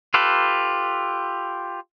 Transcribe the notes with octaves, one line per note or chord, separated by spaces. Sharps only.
F4 G4 A4 B4